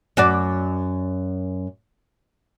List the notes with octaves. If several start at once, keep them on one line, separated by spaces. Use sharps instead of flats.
F#2 F#4 D5